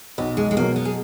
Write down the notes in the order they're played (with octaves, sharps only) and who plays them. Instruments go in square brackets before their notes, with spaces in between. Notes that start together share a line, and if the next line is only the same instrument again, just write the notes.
[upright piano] B1 [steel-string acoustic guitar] B3
[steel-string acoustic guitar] G#3
G#3
[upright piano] B2 F#3 [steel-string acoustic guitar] A#3
[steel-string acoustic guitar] B3
G#4